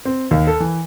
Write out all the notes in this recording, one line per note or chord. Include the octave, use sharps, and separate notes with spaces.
C4
D#2
A4
E3